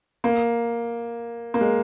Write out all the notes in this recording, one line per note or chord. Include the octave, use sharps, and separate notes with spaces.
A#3
A#3
G#3